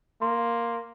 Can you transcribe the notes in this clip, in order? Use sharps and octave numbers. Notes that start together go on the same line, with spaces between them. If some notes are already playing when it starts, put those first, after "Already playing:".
A#3 C6